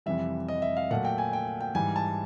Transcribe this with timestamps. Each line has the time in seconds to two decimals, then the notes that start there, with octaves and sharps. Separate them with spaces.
0.06 F2 C3 E3 G3 E5
0.48 D#5
0.62 E5
0.77 F5
0.91 A#2 F#3 A3 F#5
1.05 G5
1.18 G#5
1.33 G5
1.61 G5
1.75 G#2 E3 G3 G#5
1.96 A5